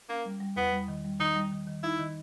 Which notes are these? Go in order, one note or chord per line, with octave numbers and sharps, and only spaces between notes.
A#3 C#4
G3
G3
E2 B3
G3
D#3
G3
D#3 D#4
G3
D#3
D#3
D#4 E4
D#3